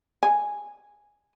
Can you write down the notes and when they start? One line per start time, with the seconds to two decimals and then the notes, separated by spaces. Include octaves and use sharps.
0.23 G#5